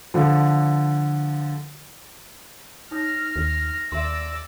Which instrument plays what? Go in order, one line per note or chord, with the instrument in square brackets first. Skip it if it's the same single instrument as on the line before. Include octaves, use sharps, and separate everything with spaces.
[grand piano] D3 F3
[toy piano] D#4 C#5 D#6 [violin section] F6 [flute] A#6
[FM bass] D#2
[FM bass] D#2 [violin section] D5 D6 E6 [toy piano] E5 C6